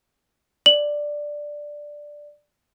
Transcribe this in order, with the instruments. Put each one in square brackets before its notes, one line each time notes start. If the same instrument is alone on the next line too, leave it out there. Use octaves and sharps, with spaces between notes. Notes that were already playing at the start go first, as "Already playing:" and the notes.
[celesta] D5 [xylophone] F#7